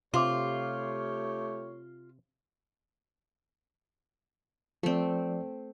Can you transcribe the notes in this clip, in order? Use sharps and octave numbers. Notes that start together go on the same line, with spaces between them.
C3 A3 F4 G4 C#5 C6 D6
F3 A3 C4 D5